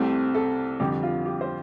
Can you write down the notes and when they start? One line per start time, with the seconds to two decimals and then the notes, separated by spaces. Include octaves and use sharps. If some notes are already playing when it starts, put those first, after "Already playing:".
Already playing: C2 C3 A3 C4
0.35 A4
0.80 F2 D3 G3 G4
1.03 F4
1.25 G4
1.41 C5